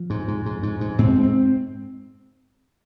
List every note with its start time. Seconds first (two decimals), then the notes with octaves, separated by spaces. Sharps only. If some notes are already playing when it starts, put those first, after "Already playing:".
Already playing: F3
0.10 G#2
0.28 G#2
0.46 G#2
0.63 G#2
0.81 G#2
0.98 G#2 C4
1.16 G#2
1.23 C4